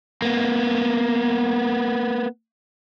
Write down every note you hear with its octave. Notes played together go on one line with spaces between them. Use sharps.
A#3 B3